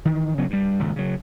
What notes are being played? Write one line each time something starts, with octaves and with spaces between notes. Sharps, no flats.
D#3 E3
C#3 F#3 B3
G2 G3
D#1 G#1 C#2
C#3 F#3